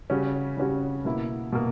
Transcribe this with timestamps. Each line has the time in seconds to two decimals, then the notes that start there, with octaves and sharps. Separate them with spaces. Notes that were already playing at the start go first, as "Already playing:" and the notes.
0.10 C#3 G3 C#4 F#4
0.57 C#3 G3 C#4 F#4
1.05 B2 A#3 E4
1.52 B2 A#3